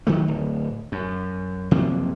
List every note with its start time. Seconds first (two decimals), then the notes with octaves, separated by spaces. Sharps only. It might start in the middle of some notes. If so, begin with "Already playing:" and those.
0.07 D#3 F#3 A3
0.28 D1
0.92 F#2
1.71 F#1 C3 F3 A#3